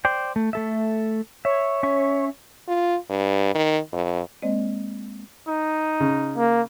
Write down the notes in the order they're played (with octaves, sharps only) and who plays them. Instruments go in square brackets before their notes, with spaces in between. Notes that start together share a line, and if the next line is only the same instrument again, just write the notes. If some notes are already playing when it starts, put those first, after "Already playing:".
[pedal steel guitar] C5 D5 G5
A3
A3 A4 E5
[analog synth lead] C#5 [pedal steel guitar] E5
[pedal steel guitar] C#4 E5 C#6
[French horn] F4
G2
D#3
F2
[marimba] G#3 A#3 C4 C5 D5 D#5
[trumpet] D#4
[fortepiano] C#3
[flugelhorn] A#3